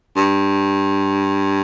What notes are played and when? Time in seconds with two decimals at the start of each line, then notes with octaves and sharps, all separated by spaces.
0.16 G2